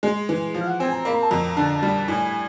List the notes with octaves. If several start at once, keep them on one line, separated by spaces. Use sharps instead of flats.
G#3
E3
F3
F5
F#5
C4 G#5
A#5
A#3 B5
A#5
A5
F2 A#5
D3 A5
A#5
A5
G3
A2 G#5